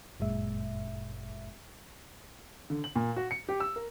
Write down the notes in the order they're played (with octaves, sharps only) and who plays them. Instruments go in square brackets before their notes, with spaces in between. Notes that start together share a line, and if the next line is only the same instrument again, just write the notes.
[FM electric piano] G1 F#2 A#2 G#3 E5
[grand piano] D3
F#7
A#2
F#4
C#7
G4
E6
A#4